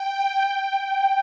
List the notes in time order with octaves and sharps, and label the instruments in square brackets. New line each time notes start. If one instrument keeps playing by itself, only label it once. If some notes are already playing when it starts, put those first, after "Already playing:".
Already playing: [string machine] G5